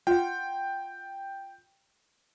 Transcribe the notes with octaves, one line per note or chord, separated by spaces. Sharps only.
F4 F#5 G5